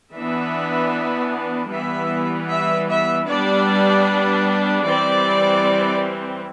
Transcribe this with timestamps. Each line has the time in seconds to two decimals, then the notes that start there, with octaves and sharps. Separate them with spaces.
0.15 E3 B3 D4 E5
1.71 E3 G3 B3 E5
2.50 E5
2.89 E5
3.28 G3 B3 D4 D5
4.84 E3 G3 C4 D5